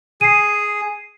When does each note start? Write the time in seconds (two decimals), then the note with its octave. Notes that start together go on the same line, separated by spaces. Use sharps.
0.21 G#4 C7 D#7